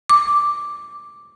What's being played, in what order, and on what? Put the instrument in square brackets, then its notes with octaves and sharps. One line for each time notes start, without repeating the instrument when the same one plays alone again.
[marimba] D6